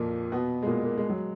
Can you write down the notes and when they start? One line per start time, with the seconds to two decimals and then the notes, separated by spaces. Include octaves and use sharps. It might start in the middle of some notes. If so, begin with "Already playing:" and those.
Already playing: F2 A#2 F3 A#3
0.32 B2 B3
0.62 G#3
0.67 A#2 A#3
0.85 A#3
0.98 G#3
1.09 F#3